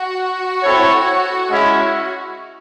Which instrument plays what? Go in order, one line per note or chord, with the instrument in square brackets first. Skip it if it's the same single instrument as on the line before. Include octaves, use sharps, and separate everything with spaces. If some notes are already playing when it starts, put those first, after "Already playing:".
Already playing: [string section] F#4
[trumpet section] C4 E4 A4 C#5
G#3 C#4 E4